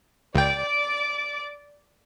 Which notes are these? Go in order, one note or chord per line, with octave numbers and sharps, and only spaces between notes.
C#2 D5 G5 D6